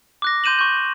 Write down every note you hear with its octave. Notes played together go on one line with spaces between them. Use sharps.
D6 F#6 A#6
C6 G6 D#7 E7 F#7
C#6 G6